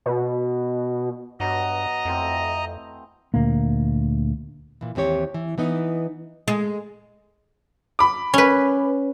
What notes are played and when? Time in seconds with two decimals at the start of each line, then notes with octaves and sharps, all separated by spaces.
0.06 B2
1.40 G2 F#3 B3 D#5 A#5
2.05 F2 E3 A3 C4
3.34 D2 A#2 A#3
4.81 A#2 E3
4.95 D#2 E3 C4 G4 C#5
5.34 E3
5.58 E3 B3 D#4
6.48 G#3
7.99 B5 D6
8.34 C#4 B4